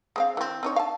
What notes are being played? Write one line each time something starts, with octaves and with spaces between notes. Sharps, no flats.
G#3 C4 F5
E3 C4
C4 D#4 C#5
F5 A5